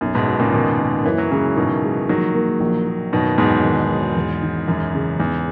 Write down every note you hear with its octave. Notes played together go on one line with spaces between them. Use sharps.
B1 F#2
G#2 B2
F#3
A#2 C#3
D#2 B2 D#3
A#3
F#2 E3
F#3
C#3 E3 G#3
G#2 B2 D#3
G#3
A#1 D#3 F#3
A#3
A#1
A#3
F#2 B2 D#3
E2 G#2 F#3
G#1
F#3
E1
D#3
E1 F#2
C#3
E2 G#2